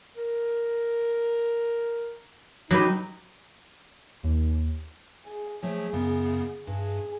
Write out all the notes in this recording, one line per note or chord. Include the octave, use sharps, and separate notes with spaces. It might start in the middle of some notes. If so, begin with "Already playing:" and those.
A#4
F#3 D#4 G4 B4
D#2
G#4
F3 F#3 A3 G#4
F#2 C#3 B3
G2 G#4